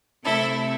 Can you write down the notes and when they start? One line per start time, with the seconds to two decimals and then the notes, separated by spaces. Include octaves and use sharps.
0.23 C3 A3 C4 E4 A4